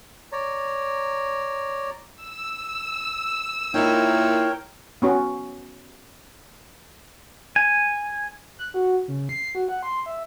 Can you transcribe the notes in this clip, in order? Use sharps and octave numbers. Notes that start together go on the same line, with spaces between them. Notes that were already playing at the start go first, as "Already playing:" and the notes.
C#5 D5 A#5
E6
A#2 D#4 E4 A#4 C#5 G5
B3 C#4 F#4
G#5
F#6
F#4
C#3
C7
F#4
F#5
C6
E5